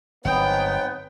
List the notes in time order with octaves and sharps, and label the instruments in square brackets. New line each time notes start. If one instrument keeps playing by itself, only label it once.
[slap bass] G1 F#3 C4 [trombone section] G#2 B3 [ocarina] C#5 [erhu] G5